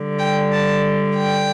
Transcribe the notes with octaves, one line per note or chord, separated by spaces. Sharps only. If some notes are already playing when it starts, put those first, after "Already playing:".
Already playing: D3 G3
G5
A5
G5